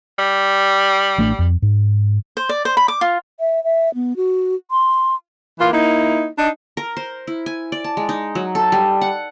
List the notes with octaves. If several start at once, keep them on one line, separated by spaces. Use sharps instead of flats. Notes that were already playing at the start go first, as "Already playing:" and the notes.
G3
A1 A3 D4
F2
G#2
C5
D5
C5
B5
D6
F4
E5
E5
B3
F#4
C6
E3 A#3 F4
A#3 D#4 E4
D4 D#4
A#4
C5
E4
G#5
D5
A5
G#3
D#4
F#3
A4
G3
F#5